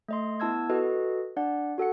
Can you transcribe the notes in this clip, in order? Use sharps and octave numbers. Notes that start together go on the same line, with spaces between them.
A3 D#5 C6
B3 E4 A5 E6 G#6
F#4 A4 B4 D#5
D4 D5 F#5
F#4 A4 F#5 C#7